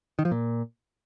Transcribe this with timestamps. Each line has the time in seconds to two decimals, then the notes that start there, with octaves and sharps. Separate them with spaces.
0.19 D#3
0.25 F3
0.31 A#2